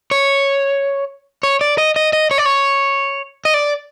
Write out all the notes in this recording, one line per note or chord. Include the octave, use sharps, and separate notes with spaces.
C#5
C#5
D5
D#5
D#5
D#5
C#5
D5
C#5
D#5
D5